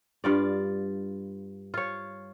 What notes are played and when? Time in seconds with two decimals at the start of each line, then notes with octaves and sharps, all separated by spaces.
0.24 G2 F4 D5
1.74 F4 C#5